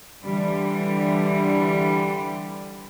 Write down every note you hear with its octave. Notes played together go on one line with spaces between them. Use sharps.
D3 E3 G3